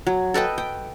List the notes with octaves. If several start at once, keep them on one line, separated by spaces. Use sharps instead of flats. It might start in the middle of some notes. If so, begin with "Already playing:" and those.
F#3
A4 B4 D#5 G5
G5